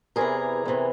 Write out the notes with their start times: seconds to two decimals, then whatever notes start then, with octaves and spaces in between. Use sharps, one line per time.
0.16 E2 C3 E3 G#4 A#4
0.65 E2 C3 E3